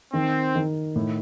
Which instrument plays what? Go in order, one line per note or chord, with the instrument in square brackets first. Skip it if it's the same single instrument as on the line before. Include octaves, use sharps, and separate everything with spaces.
[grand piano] D#3 [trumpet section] C4
[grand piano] D#3
A2